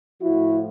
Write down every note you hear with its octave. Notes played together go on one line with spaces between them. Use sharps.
A2 F3 E4 F#4